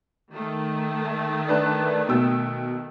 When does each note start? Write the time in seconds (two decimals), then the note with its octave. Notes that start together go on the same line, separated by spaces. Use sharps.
0.32 D#3 A3
1.48 D4 B4 A5
2.09 B2 G5 E6